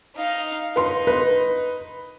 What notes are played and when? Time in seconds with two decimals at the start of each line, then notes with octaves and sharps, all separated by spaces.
0.16 D#4 F5
0.76 D#4 B4 C6
1.07 B4